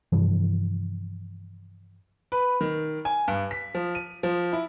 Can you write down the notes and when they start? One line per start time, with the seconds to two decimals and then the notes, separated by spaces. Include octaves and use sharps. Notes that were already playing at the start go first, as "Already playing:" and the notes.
0.12 G2 C3 E3 F3
2.32 B4
2.61 D#3
3.05 G#5
3.28 G2
3.51 B6
3.75 F3
3.95 D#7
4.23 F3
4.53 E4